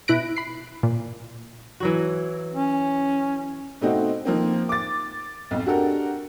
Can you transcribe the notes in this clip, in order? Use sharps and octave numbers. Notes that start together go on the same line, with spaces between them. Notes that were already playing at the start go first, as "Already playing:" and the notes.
B2 E4 B5 F#6 A#6 D7
B5 C7
A#2
E3 F#3 F#4
C#4
B2 A3 C4 D#4 F#4
D#3 F3 A#3 C4
D6 A6
B1 F2
D4 F#4 G4 A4 A#4